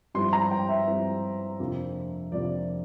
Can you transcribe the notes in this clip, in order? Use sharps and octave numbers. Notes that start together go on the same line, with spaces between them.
G2 F3 C4 E4 C6
A#5
G5
E5
G2 F3 C4 E4
F2 C3 F3 A#3 D4
F2 C3 F3 A#3 D4 D5